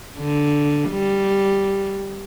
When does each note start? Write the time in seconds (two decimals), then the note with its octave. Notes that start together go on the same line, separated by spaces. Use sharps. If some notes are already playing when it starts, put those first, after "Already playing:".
0.18 D3
0.90 G3